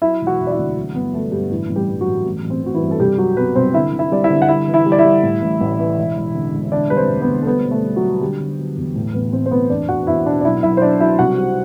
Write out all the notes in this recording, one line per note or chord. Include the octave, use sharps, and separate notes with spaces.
F#3 E4 E5
E1
F#4 F#5
E1
D5
E4 E5
D2
F#3
G1 B3 B4
G1 A3 A4
G2 G3 G4
A1 E3 E4
A1
G3 G4
G2
F#3 F#4
A1
A1
A1
C4
A1 F#4
E3 E4
G2
A4
C2 G3 G4
F#3 G3 F#4
C2 B3 B4
C2 C4 C5
D3 E4 E5
D3
E4 E5
G3 D5
E4 E5
D3
F#5
G3 E4 E5
E3
E4 E5
G3
D5
E4 E5
G3
A2
A1
A1
E3
E1
E1
D3
E1
D3 D4 D5
G3 B4
C4 C5
D2
B3 B4
D2
A4
G3 B3 B4
B2
A3 A4
G3
F#3 F#4
G3
D3 G3 G4
D3
F#3
E2
A2
A1 B3 B4
A1 C4 C5
C5
A2 B3 B4
E2 D4 D5
E2 F#4 F#5
E2 E4 E5
B2 D4 D5
D5
B1 E4 E5
B1 E4 E5
C5
F#3 D4 D5
F#3 E4 E5
C2 F#4 F#5
G3